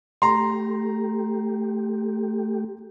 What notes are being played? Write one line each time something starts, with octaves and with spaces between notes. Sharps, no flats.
A3 G4 A#5 C6